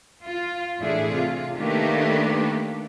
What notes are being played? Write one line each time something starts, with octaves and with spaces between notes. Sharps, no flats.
F4
E2 A2 A3 D4 E4 G#4
C3 F4
D#3 A3 A#3 D4 G4 B4